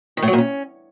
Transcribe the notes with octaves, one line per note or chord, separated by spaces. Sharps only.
D#3
A2
F#3
A#2
C#4